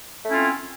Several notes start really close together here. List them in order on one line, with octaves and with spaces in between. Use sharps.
A3 C#4 E4 F4 C4